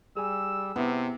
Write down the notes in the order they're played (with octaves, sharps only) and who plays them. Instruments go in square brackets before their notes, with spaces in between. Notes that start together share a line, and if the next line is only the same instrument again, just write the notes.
[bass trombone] G3 [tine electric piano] G#4 G#5 [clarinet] E6
[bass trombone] C3 [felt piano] B3 E4